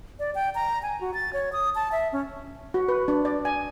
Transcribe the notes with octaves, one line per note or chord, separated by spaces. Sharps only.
D5
G5
A#5
G#5
F#4
A6
C#5
D#6
A5
E5
C#4
F#4
B4
D4
D5
G#5